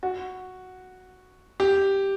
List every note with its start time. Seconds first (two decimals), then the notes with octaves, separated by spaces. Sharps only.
0.03 F#4
1.60 G4